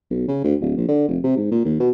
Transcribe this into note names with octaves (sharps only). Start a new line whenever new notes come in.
B1
C#3
D2
D1
A#1
D3
F1
C3
G#2
A#2
D#2
B2